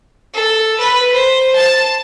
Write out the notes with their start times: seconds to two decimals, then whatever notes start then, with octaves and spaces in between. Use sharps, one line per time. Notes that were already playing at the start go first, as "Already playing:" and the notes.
0.34 A4
0.79 B4
1.13 C5
1.55 A5